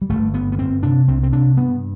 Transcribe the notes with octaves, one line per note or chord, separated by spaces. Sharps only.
G3
G1 A3
G1 B3
B3
G1 C4
C3 D4
C2 C4
C4
C3 D4
G2 B3